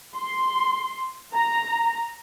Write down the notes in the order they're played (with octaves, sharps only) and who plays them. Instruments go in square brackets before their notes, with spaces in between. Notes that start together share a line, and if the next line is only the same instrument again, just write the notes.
[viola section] C6
A#5